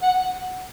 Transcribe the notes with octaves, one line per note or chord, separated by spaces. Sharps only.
F#5